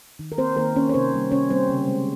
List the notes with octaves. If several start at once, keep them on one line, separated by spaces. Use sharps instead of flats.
D#3
A#4
A#3 C4 C5
D#3 A#3 A#4
A#3 C#4 C#5
C#5
C3 C4 C5
G3 A#3
C3 C#4 C#5
G3 A#3 C4 C5
C#3
G#3